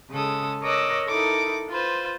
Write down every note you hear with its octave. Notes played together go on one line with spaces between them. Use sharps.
C#3 G#3 A4 D#6
A#4 C#5 D#5 D6 E6 F#6
D#4 E4 A4 A#4 D6 D#6
F4 B4 C5